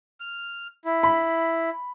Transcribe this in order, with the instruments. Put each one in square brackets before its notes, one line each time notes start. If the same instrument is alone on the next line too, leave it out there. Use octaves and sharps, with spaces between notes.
[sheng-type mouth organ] F6
E4
[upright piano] B5